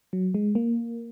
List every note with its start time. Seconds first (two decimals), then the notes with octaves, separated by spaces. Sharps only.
0.13 F#3
0.34 G#3
0.55 A#3